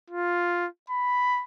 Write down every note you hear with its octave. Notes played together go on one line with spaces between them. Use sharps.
F4
B5